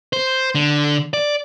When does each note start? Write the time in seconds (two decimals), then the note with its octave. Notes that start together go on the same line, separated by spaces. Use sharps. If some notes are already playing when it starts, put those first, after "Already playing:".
0.13 C5
0.55 D3
1.13 D5